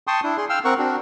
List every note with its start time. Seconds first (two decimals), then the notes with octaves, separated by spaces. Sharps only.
0.07 G5 A5 C6 C#6 D#6
0.23 D4 E4
0.37 G#4 C6
0.50 F5 G5 E6 F6
0.65 C4 A#4 F#5 C#6
0.78 C4 D4 F#4